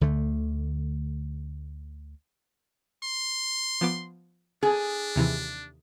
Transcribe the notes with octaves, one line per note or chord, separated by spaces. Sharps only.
D2 D3 A3
C6
F3 B3 D6
D4 G#4
D#2 C3 E3